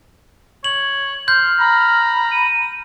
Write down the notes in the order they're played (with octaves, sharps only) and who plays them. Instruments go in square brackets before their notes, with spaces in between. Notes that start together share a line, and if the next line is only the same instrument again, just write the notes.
[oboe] C#5 [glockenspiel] F#7
[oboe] C6 [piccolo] F6 [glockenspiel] G6
[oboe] A#5 [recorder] B5
[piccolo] D#7